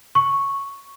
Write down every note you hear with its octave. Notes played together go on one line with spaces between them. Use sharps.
C#6